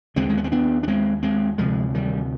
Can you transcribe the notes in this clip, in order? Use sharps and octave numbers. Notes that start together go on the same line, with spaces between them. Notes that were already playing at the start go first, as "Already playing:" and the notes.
D#2 D3 G#3 C4
G#3
B3
C4
B3 D4
D4
G#3 C4
G#3 C4
D2 C3 F3 G#3
D#3 G3